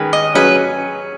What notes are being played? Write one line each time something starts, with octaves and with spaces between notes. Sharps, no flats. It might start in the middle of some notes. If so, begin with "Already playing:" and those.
Already playing: D#3 G#3 C#4 B4
D#5
F#3 C#4 G#4 B4